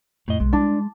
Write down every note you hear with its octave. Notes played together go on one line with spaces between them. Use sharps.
F2 A2 D#5
B1 G#3
G3 D4